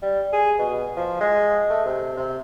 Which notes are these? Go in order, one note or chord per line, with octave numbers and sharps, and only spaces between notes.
G3
G#4
B2
F3
G#3
A3
C3
C3